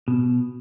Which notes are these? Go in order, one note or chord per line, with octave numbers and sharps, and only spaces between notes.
B2